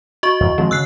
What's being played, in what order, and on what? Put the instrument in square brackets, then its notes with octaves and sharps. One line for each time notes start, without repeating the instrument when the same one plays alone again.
[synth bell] F#4 D#5 C#6
[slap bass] E2
[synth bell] D#3 [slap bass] F3 G#3 C4
[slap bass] C#3 [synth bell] E6 F#6 C7